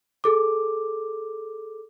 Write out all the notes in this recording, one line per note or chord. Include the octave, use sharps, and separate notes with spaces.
G#4 A4 D6